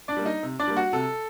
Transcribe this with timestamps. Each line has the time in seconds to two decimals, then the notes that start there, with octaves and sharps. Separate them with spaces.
0.08 D4 D5
0.17 G3 A#3
0.25 D#4 D#5
0.43 C3
0.59 D4 D5
0.67 G3 A#3
0.76 F#4 F#5
0.93 C3 A4